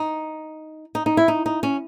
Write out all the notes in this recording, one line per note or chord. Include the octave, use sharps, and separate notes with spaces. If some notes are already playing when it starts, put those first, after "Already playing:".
Already playing: D#4
D#4
D#4
E4
D#4
D#4
C#4